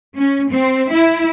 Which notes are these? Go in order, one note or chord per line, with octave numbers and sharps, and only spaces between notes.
C#4
C4
E4